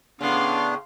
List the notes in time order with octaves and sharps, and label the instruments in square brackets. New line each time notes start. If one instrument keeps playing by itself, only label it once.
[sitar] A2 C#3 [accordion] B3 D4 [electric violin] F5 C6